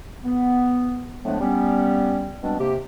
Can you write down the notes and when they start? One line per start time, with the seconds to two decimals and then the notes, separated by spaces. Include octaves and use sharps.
0.24 B3
1.24 A2 F3 G#3 A3 B3 D4
1.40 G3 B3 C#4
2.42 B2 G3 G#3 B3 C4 D4
2.59 C3 A#3 G4